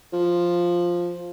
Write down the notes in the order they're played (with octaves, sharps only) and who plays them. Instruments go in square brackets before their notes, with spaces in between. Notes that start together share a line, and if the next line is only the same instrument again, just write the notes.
[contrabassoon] F3